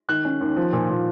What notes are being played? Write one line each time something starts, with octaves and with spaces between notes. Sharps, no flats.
D#3 F#6
C#4
D#2
F3
A#2
A#2